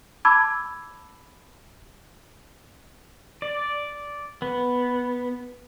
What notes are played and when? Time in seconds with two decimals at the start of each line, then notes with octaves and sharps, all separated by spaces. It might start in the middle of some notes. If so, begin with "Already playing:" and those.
0.25 A5 B5 D6 E6 G#6
3.42 D5
4.42 B3